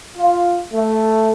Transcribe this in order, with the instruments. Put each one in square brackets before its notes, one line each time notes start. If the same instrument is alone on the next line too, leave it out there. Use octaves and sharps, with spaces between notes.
[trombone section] F4
A3